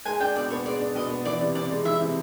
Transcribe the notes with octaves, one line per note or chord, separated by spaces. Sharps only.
G#3 G#5
D4 G5
B2 D5
B3 C#5
G#3 D5
D4
B2 D#5
B3
E3 D5
C3
C3 D5
G#3
E3 E5
C3